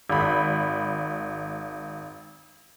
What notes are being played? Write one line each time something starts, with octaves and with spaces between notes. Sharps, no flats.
G#1 B5